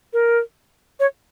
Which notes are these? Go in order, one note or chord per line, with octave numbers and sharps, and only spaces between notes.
A#4
C#5